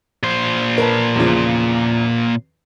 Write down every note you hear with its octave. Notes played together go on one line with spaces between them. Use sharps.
A#2 C5
A#4 B4 A5
E2 C#3 F3